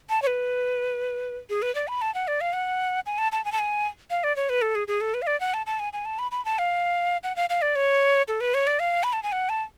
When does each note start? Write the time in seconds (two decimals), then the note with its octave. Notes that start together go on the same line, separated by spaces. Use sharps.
0.09 A5
0.22 C#5
0.27 B4
1.50 G#4
1.62 B4
1.75 D5
1.88 B5
2.02 A5
2.15 F#5
2.28 D5
2.41 F5
2.53 F#5
3.06 G#5
3.18 A5
3.32 A5
3.45 G#5
3.52 A5
3.59 G#5
4.10 F5
4.24 D5
4.36 C#5
4.49 B4
4.62 A4
4.75 G#4
4.88 G#4
5.01 A4
5.14 B4
5.22 F5
5.27 D5
5.40 F#5
5.54 A5
5.66 A5
5.79 G#5
5.93 G#5
6.05 A5
6.19 B5
6.32 B5
6.45 A5
6.59 F5
7.23 F#5
7.36 F5
7.50 F5
7.62 D5
7.76 C#5
8.28 A4
8.41 B4
8.54 C#5
8.67 D5
8.80 F5
9.04 B5
9.13 A5
9.23 G#5
9.32 F#5
9.49 A5